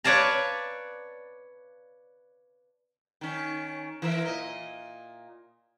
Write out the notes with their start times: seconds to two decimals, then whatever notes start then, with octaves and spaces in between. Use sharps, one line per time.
0.04 B4 C#5 D5 F5 A5 A#5
3.21 D#3 C#4
4.02 E3 A#4 E5
4.26 A#2 D#5